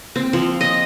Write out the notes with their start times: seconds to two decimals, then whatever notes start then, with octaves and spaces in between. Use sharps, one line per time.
0.16 C4
0.33 F3
0.61 D#5